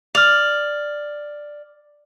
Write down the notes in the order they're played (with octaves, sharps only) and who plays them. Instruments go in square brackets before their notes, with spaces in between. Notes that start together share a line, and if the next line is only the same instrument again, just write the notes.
[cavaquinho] D5 [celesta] F6 F7